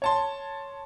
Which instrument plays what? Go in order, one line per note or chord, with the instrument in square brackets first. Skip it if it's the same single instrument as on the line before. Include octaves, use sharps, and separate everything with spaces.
[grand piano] C#5 A5 C6